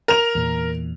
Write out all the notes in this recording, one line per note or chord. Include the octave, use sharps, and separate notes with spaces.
A#4 F7
E2 A#2